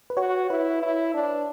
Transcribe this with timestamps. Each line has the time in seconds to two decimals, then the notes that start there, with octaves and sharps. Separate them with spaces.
0.10 B4
0.17 F#4 C#5
0.50 E4 B4
0.82 E4
1.14 D4